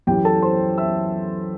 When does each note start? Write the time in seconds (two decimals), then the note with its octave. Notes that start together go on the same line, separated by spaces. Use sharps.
0.07 F#2 E3 G4 G5
0.25 A4 A5
0.42 C5 C6
0.78 E5 E6